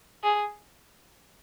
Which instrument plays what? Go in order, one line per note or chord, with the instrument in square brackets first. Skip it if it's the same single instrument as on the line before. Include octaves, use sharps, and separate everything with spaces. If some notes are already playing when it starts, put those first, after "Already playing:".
[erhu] G#4